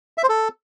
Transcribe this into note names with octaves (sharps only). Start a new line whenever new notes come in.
E5
C5
A4